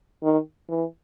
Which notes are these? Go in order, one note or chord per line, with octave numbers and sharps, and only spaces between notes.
D#3
E3